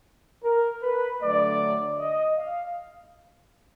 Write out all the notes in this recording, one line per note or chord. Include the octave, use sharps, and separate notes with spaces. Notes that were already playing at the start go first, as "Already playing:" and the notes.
A#4
B4
D3 F#3 A3 D5
D#5
F5